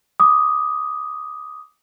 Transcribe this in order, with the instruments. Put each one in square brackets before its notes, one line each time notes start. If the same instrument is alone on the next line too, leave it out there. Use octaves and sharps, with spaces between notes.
[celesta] D6 D#6